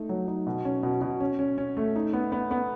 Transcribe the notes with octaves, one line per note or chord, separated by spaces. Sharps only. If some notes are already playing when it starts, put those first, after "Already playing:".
Already playing: A3 D#4
F#3
D#4
B2
C#4
B2
B2
C#4
C#4
C#4
A3
D#4
B3
B3
B3